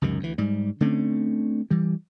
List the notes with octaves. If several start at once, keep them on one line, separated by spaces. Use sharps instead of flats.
C#2 F#2 C3 D#3
D2 E3
G#2 G3
D3 A3 C4 C#4
E3 G3